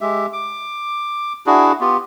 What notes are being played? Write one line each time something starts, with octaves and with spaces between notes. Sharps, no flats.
G#3 G4 E5
D6
D4 E4 F#4 G#4
B3 F4 G4